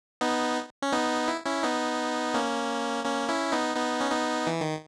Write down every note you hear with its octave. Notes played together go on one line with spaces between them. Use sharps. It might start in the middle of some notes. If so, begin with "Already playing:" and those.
B3 D#4
C#4
B3 D#4
E4
C#4 E4
B3 D#4
A#3 C#4
A#3 C#4
C#4 E4
B3 D#4
B3 D#4
C#4
B3 D#4
E3
D#3